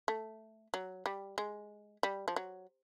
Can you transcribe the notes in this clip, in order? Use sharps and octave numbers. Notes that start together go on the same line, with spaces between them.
A3
F#3
G3
G#3
G3
F3
F#3